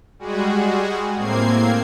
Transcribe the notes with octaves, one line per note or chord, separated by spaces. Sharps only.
G3 G#3 F#4 G#4
A2 A#3 C4 G#6 C7